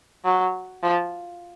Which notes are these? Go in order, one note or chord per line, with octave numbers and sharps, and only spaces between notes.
F#3
F3